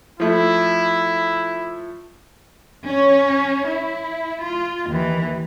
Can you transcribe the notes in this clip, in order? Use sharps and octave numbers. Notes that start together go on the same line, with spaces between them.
F3 A3 E4
C#4 C#5
E4
F4
D#2 E3